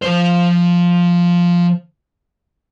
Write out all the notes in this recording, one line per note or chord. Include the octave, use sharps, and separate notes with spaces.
F3 C5